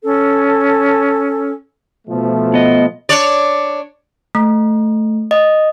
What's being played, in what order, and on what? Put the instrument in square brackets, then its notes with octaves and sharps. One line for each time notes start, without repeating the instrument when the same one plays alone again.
[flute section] C#4 A4
[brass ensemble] B2 F3 A3
[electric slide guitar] B3 D#5
[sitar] D4 C#5 D5
[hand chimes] A3
D#5